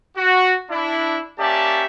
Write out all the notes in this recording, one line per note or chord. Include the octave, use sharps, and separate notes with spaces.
F#4
D4 E4
A#3 C#4 G4 D5 E5 A5